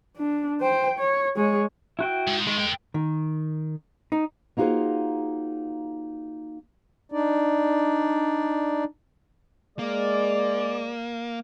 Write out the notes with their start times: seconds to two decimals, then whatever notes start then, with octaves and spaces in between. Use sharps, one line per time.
0.17 D4
0.61 C5 G5
0.99 C#5
1.36 G#3 C#5
1.99 E4 F#4 G5
2.28 G#2
2.47 D#3 G#3
2.59 A#3 G5
2.94 D#3
4.12 D#4
4.57 A#3 D#4 F4 F#4 G#4 C5
7.12 D4 D#4 D5
9.79 G#3 A#3 D5